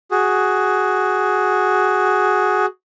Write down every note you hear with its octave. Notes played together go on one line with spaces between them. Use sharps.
F#4 G#4